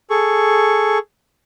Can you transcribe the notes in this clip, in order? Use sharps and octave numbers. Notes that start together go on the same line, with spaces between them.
G#4 A4 C#6